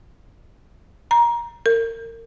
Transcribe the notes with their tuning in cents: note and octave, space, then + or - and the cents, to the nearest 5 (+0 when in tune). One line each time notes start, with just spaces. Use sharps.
A#5 +20
A#4 -30